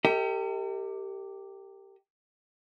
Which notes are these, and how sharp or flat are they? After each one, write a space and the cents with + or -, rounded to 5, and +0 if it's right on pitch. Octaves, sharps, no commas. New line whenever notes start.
G4 +0 A#4 -45 D#5 +40